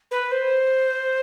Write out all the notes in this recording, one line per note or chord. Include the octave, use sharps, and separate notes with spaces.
B4
C5